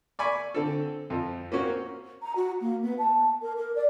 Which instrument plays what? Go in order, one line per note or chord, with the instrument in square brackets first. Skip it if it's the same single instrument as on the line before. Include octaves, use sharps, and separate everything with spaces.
[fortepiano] D5 G#5 B5 C#6
D3 C4 A4
F2 F3
A#3 C4 C#4 F#4
[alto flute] A#5
F#4
A#3
B3
A5
A#4
A#4
D5